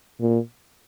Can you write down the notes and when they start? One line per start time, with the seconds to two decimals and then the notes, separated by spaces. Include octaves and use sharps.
0.20 A#2